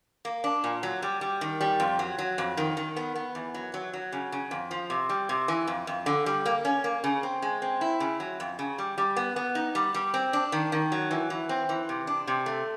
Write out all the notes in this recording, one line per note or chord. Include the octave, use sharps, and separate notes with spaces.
A#3
D4
A#2
F#3
G3
G3
D#3
G3
F2
F#3
F#3
F2
D#3
D#3
B3
B3
E2
F#3
F#3
F#3
C#3
C#3
F2
F3
C3
G3
C3
E3
F2
F2
D3
G3
A#3
C#4
A#3
C#3
C4
G#3
C4
E4
C#3
F#3
F2
C#3
G3
G3
B3
B3
D#4
G3
G3
C4
D4
D#3
D#3
F#3
E3
E3
C4
E3
C3
D4
C3
A3